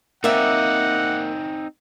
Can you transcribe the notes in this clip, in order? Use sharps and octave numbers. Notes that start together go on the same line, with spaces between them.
A#3 C4 D#4 D5 E5 F#5